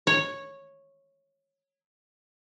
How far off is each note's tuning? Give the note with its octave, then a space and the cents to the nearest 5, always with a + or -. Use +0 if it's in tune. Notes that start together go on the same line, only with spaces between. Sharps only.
C#5 -10